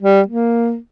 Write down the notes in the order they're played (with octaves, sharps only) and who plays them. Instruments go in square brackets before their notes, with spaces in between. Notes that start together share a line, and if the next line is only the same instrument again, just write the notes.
[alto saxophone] G3
A#3